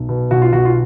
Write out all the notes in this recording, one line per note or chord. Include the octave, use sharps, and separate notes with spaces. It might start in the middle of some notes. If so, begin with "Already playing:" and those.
Already playing: B1
B2
B1 F#4
F4
B1 F#4
F4